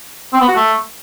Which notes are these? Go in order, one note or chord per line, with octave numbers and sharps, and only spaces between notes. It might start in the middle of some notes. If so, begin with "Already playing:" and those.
C4
B3
F#4
A3